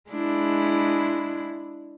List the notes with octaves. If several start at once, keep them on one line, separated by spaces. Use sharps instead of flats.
G#3 D4 E4